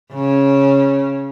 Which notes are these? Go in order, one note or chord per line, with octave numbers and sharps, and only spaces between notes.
C#3 C#4